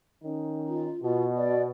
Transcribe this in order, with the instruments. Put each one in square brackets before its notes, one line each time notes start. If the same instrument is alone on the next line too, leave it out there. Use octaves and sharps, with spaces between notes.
[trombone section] D#3 C#4 D#4
[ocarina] F4
[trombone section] B2 [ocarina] F4
[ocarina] D5